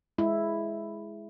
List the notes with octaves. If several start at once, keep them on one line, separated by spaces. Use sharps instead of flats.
G#3 E4